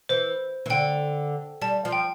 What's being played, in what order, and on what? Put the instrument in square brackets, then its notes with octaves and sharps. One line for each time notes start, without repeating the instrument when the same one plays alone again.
[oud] E3 [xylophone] C5
[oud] E3
[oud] D3 [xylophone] G5
[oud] G3 [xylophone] A5
[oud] F3
[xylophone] G5